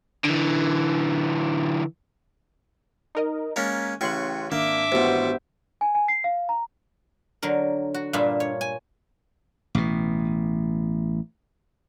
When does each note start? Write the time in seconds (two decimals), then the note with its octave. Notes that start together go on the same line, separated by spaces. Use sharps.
0.24 D3 E3
3.15 D#4 A#4 D#5
3.56 G#3 A#3 C#4 A#5 A6 B6
4.01 A1 C#3 G5 C6 C#6 F#6
4.52 G#1 A#3 D4 E5 D6
4.92 A1 B2 B3 G4 C5
5.81 G#5
5.95 G#5
6.08 C7
6.24 F5
6.49 A#5
7.43 D3 F#3 A#4
7.94 F#4
8.13 G2 A#2 A#3 D4 F4 E5
8.40 C#5
8.61 G#5
9.75 A1 B2